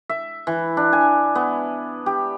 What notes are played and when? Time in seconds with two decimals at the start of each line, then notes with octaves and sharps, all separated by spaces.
0.09 E5
0.47 E3
0.77 D4
0.93 G#5
1.35 B3
2.06 G4